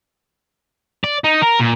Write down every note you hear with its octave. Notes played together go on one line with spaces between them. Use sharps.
D5
D#4
A#4
A#2